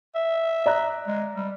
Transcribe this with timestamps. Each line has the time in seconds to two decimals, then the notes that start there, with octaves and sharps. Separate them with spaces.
0.15 E5
0.66 D5 A#5 F#6
1.07 G#3
1.35 G3